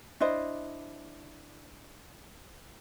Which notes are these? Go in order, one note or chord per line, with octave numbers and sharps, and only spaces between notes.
D4 E4 C5 D#5